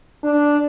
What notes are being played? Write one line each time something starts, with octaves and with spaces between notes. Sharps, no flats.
D4